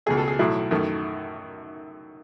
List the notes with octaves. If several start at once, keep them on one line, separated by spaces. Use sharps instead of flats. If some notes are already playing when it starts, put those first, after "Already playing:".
C#2 B2 A3 G#4
A4
G#4
B1 A2 F#3 A3 E4
F#2 D#3 A3